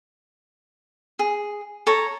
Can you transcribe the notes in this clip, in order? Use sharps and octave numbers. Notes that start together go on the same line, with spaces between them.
G#4
A4 C#5 A#5